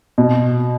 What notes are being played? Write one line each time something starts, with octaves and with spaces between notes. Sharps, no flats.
B2